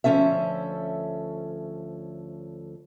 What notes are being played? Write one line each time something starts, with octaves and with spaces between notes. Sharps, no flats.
D2 F3 A3 C#4 A4 E5